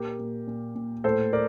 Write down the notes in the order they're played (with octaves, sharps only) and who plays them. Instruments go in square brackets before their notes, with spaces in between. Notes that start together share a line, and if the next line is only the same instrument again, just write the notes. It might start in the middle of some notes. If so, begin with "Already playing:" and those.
Already playing: [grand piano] A#2 G4 A#4
A#2
A#2
A#2
A2 A4 C5
A#4 D5